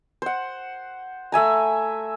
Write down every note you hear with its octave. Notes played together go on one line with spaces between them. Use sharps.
C5 F#5
A3 E5 G#5 A#5